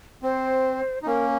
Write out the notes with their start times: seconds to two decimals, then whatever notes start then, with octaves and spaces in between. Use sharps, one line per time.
0.22 C4 C5
1.02 D#4
1.06 A#3 C#4 A#4